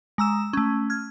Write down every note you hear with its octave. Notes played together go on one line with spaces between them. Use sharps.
G#3 A#5 E6 E7
A3 C#4
F6 G#6